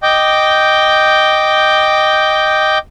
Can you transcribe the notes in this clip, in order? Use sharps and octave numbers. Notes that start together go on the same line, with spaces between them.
D#5 G5 D6 G6